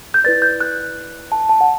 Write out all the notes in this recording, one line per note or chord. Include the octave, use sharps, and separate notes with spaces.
G6
E4 B4 D5 A6
G6
F#6
A5
A5
F#5